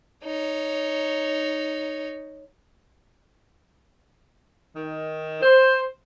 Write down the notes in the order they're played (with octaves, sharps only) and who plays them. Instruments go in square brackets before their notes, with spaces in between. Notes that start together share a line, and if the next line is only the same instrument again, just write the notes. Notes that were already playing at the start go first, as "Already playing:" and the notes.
[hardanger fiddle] D#4 C#5
[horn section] D#3
C5